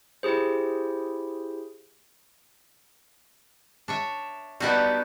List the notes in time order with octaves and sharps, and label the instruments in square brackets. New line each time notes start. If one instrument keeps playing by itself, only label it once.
[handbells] E4 G4 G#4 C5
[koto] D4 C#5 E5
[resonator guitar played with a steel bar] G3 D4 [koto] B3 D#4 F#4